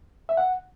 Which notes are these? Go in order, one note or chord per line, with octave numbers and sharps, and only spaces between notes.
E5
F#5